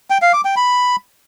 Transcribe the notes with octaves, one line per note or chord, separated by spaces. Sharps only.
G5
F5
D6
G5
B5